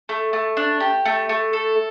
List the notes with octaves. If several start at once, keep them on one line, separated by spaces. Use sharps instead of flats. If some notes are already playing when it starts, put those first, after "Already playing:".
A3
A3
D4
G4
A3
A3
A4